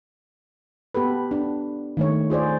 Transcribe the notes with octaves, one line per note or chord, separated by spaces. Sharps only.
B3 G4 A4 B4
D4
D#3 A3 C#5
F4 G#4 C5 D5